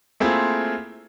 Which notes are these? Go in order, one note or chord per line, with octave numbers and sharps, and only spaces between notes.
A3 A#3 C4 E4 F4 G#4